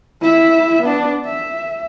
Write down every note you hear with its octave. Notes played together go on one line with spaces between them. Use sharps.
E4 E5
B3 D4
E5